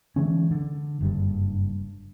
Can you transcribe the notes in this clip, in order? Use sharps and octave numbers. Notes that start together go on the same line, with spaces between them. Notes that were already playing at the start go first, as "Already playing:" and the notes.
D3 E3 G#3 C#4
D3
F#1 G2 G3